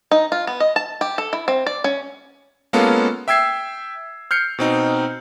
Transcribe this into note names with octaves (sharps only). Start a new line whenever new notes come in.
D#4
F4
B3
D#5
A5
G4
A4
E4
C4
D5
C#4
G#3 A#3 B3 C#4 F4 A4
E5 G5 E6 G#6 C7
F6 G6 C7 C#7
B2 C4 D#4